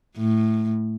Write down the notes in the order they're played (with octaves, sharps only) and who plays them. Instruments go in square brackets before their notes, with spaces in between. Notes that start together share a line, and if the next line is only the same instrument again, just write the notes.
[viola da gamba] A2